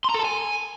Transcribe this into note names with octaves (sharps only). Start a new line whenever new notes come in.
C6
A#5
A4
A5
G#5